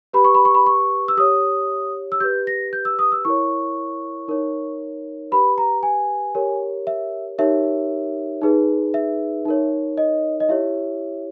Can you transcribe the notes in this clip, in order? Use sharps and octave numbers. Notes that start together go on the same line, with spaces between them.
G4 B4 B5
C#6
B5
C#6
B5
C#6
E6
G4 C#5 D#6
E6
G4 B4 G6
A#6
G6
E6
D#6
E6
E4 A#4 C#5 C#6
D#4 A#4 C#5
G4 B4 B5
A#5
G#5
G4 A#4 C#5
E5
D#4 G4 A#4 C#5 E5
D#4 G#4 B4
E5
D#4 A#4 C#5
D#5
D#5
E4 G4 C#5 E5